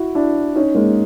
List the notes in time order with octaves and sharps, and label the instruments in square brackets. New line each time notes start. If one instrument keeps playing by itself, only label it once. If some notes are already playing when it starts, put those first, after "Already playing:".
Already playing: [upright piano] E4 F#4
D4 E4
C#4 D#4
G#3 A#3